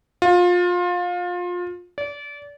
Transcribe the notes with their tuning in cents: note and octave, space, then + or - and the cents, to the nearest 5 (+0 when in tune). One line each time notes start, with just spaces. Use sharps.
F4 +25
D5 -30